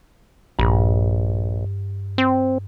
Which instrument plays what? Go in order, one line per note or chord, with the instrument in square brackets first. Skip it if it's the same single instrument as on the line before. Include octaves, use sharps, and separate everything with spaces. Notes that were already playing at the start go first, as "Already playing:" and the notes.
[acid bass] A#1 [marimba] G2
[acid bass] C4